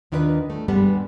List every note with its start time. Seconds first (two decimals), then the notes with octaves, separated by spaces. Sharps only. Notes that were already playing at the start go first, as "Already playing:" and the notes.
0.12 D#2 D#3 D4 E4 F4 B4
0.50 A3
0.68 G2 G3 G#3 B3